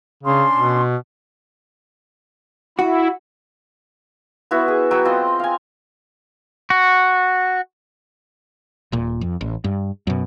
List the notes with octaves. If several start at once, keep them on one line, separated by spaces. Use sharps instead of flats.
C#3 C#4 D4 C6
B2
E4 F#4
B3 E4 F#4
G#4
F#3 G5
C4 F4 D#5
F5 G#5
F#4
D#1 A#2
F2
A1
G2
F#2 B2